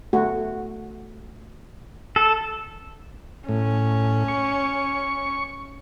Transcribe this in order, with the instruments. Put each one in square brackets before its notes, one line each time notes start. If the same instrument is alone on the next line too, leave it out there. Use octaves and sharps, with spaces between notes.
[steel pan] A3 F#4
[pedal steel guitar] A4
[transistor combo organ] A2 [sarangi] C#4
[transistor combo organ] C#6